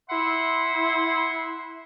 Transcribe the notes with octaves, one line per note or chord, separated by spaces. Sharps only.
E4 E5 F#5 C6